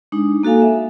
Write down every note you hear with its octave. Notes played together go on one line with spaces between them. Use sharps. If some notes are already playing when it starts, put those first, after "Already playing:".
G#3 D4 D#4
A#3 F#4 A4 F5 G#5
E5